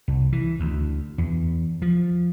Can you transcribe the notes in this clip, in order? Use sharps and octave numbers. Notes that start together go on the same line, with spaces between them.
C2
E3
D2
E2
F3